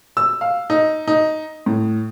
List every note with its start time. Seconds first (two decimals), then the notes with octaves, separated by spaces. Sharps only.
0.17 E6
0.41 F5
0.70 D#4
1.07 D#4
1.66 A2